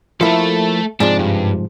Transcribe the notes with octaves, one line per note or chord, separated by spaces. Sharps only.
F3 A3 A#3 E4 A4
G#2 C3 F3 D4
G2